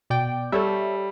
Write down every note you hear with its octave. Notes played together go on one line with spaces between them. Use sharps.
B2 D5 G5
G3 A4 C#5 E5